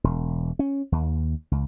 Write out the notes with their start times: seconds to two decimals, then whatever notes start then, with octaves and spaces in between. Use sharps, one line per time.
0.04 E1
0.59 C#4
0.92 D#2
1.51 C#2